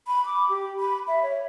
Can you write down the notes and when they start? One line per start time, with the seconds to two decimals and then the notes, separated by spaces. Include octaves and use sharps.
0.07 B5
0.26 D6
0.49 G4
0.79 B5
1.08 E5
1.22 C#5